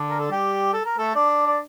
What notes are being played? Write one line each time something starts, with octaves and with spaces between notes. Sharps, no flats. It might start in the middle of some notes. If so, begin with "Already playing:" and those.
Already playing: D3 D4
A#4
A4
G3 G4
A4
A#4
A3 A4
D4 D5
D5